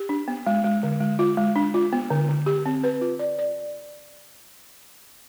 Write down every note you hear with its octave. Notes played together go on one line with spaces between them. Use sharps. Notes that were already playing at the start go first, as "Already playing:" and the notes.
Already playing: G4
D4
B3
G#3
G#3
D3
G#3
F4
G#3
D4
F4
B3
D3
D3
G4
C4
B4
F4
D5
D5